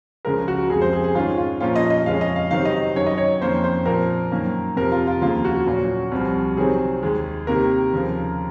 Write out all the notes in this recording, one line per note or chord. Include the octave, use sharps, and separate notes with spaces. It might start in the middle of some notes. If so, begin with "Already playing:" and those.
C#2 C#3 F3 G#3 A#4
F#4
F2 C#3 G#3 G#4
C5
G#4
G#4
G#2 D#3 G#3 C#4 F4
F4
A#2 F3 A#3 C#4 F4
D#5
D#5
F2 C#3 G#3 C#4 F5
D#5
F5
C3 D#3 F#3 C4 F5
D#5
F#2 D#3 F#3 C#5
D#5
C#5
F2 D#3 A#3 C#4 C5
C5
A#2 F3 C4 A#4
F#2 D#3 A#3
F2 C3 F3 A#4
F4
F4
D#2 C#3 F3 A#3 F4
F#4
A#2 F#3 A#3 C#4
C2 C3 F3
C3 D#3 F#3 C4 G#4
D#2 D#3 G#3
C3 D#3 A#3 A#4
D#2 C#3 F3